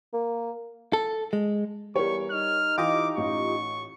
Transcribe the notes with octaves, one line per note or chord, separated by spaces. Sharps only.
A#3
A4
G#3
E2 G3 G4 A#4 C#5 C#6
D#4 F6
E3 F4 G4 D#5 D6
A1 C#6